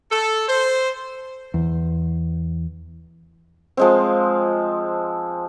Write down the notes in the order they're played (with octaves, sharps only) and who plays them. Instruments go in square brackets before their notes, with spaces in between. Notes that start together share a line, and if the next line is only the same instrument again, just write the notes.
[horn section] A4
C5
[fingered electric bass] E2
[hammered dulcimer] F3 G#3 C4